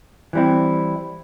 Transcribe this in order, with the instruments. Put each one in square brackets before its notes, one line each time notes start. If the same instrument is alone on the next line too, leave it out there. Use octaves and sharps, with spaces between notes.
[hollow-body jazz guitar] E3 G3 C4 E4